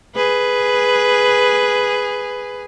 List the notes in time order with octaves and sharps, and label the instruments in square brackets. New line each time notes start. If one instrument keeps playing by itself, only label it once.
[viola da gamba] G#4 B4